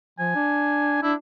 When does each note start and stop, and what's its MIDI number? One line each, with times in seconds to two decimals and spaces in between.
0.19 0.32 53
0.19 1.00 80
0.35 0.99 62
1.03 1.14 62
1.03 1.13 64